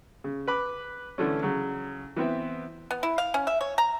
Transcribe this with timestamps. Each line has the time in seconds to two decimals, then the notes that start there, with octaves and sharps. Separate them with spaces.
0.24 C#3
0.47 B4 B5 D6
1.18 D3 E3 A3 C#4
1.43 C#3 F#3
2.16 E3 B3 C4 E5
2.91 B3
3.03 E4
3.18 F5
3.34 C#4
3.47 E5
3.61 C#5
3.78 A#5